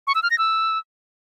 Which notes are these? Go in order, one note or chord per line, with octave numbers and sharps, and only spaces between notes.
C#6
E6
F6
A#6
E6